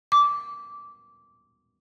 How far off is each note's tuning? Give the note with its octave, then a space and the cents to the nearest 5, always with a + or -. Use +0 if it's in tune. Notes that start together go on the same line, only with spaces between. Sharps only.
D6 -15